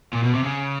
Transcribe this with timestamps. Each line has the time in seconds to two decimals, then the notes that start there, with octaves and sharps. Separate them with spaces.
0.13 A#2
0.23 B2
0.34 C3
0.44 C#3